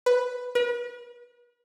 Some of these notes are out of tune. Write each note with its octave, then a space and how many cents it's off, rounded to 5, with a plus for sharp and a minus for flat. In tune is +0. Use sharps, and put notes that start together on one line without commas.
B4 +5
B4 -40